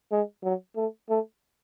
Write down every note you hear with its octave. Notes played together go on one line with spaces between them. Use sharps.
G#3
F#3
A3
A3